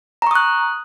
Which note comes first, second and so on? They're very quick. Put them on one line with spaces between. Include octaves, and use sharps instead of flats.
A#5 C#6 D#6 F#6